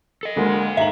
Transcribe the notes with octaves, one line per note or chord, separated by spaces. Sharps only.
A4 D#5
D2 G#3 A#3
G#2 E5 F5 A#5 F#7